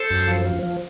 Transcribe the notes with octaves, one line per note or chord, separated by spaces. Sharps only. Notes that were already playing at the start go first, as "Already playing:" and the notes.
Already playing: A4 C5
F#2
F3
F3
F3